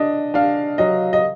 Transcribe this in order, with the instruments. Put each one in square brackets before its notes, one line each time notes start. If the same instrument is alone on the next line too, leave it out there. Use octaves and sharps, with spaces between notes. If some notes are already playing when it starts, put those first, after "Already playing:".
Already playing: [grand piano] D4 [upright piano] D#5
[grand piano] D4 [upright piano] F5
[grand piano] F#3 [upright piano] D#5
[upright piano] D#5